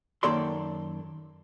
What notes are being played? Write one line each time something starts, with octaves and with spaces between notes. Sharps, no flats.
F#2 D#3 A#3 A4 D5 C6